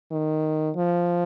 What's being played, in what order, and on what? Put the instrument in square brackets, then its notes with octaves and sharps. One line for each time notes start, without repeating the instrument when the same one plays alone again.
[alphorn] D#3
F3